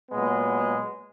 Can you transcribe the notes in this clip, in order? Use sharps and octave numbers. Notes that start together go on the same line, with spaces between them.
A#2 F#3 G#3 B3